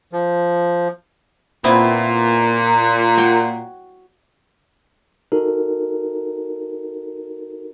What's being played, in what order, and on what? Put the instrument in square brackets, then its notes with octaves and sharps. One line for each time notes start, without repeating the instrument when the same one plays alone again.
[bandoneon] F3
[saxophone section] A#2 [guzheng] B3 C4 E4
[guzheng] F#4 C#5 G5
[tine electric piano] D#4 F#4 A4 A#4